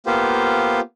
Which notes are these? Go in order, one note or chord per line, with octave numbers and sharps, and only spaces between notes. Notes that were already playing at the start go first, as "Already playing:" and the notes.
A#3 B3 F4 G4 C5